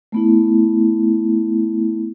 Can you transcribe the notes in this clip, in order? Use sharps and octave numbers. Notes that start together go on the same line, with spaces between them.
A3 B3 E4